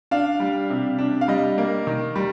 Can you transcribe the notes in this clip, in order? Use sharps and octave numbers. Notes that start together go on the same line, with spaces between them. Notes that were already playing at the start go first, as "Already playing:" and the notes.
D4 F5
G3
C3
D4
F5
G3 D#5
A#3
D#3
G3